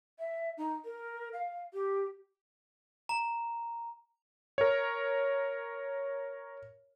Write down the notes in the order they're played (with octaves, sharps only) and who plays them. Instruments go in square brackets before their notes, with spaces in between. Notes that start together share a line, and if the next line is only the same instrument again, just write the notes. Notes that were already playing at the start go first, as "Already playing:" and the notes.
[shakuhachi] E5
D#4
A#4
F5
G4
[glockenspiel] A#5
[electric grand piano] A#4 C#5